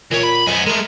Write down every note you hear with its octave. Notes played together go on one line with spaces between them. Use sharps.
A#2 E3 C#5 D6
B5
F#2 B3 C5 D#5 G#5
G#3 A3 A#4